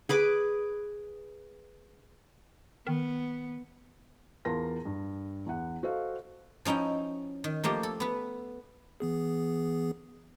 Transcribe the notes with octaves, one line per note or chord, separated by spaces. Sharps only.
G#4 B4 D6
D#3 B3
E2 F4 A#4 A5 C6 A#6
G2
E2 F#5
F#4 A4 C5 D#5 F5
F3 C#4 D#4 E4 G5
D#3
F3 A3 A#3 G4
A4
B3 B4
E3 B3 G#4